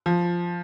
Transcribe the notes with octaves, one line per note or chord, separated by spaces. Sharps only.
F3